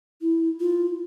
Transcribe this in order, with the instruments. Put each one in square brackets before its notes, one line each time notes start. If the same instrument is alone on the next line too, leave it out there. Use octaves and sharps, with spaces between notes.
[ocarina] E4
F4